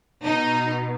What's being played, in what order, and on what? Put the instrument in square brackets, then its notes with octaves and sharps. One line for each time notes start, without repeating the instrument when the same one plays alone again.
[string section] B2 D#4